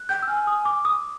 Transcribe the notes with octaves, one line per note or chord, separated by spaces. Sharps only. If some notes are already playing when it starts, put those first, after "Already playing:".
Already playing: F#6
G5 G6
E6
G#5 F6
D#6
D6
D#6